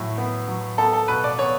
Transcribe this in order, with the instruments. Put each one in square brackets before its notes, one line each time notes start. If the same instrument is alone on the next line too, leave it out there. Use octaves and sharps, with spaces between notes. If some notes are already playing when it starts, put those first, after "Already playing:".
Already playing: [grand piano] A2 F#3
B3
F#3
B3 A4
A4
B2 B4
D5
B3 C#5